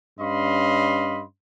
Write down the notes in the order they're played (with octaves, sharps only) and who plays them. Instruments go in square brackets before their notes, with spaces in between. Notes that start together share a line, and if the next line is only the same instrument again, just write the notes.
[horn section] G2 C#4 D#5 F5 B5 C6